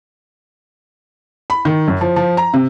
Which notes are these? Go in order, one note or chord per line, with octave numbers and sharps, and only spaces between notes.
B5
D#3
F#2
F3
F3
A#5
C3